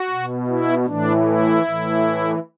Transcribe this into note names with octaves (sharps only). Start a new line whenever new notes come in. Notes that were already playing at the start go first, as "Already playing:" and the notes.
Already playing: F#4
B2
E4
A2 E3 D4
E4
A2 E3